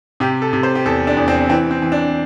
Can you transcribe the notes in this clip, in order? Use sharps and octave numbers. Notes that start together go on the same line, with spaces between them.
C3 G4
A4
C3
C5
G4
E2 A4
D4
E2
C4
E3 C4
C4
E3
D4